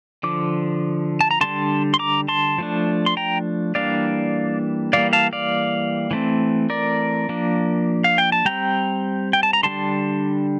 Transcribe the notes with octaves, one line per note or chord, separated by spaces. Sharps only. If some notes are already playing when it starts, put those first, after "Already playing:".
D3 F3 D6
A5
A#5
D3 G3 D4 A5 C6
C6
A#5 D6
A5 C6
F3 A3 D4
C6
G5 A#5
E3 G3 A#3 D4 D5 F5
E3 G3 A#3 D5 F5
F5 A5
D5 F5
E3 A3 C4
A#4 D5
F3 A#3 D4
F5
G5
A5
G3 C4 G5 A#5
G5
A5
A#5
D3 G3 D4 A5 C6